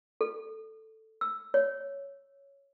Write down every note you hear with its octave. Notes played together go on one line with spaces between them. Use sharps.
A4
E6
C#5